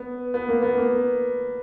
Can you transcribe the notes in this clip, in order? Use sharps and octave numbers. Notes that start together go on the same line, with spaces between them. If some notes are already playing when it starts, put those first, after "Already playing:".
Already playing: B3
B3
A#3
B3
A#3